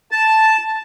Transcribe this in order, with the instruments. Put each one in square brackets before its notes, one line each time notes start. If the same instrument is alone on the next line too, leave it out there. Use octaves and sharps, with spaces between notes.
[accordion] A5